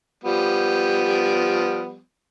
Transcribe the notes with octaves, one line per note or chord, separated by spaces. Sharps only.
F3 G3 B3